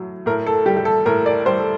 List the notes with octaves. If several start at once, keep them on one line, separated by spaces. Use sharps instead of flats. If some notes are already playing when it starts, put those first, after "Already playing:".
Already playing: A2 F#3
A2 A#4
A4
G3 G4
G4
A4
A2 A#4
D5
G3 C5
A4